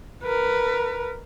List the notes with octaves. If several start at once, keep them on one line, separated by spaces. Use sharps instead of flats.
A#4 B4